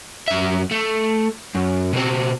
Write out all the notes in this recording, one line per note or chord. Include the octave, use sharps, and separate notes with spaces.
F#2 E5
A3
F#2
B2 C4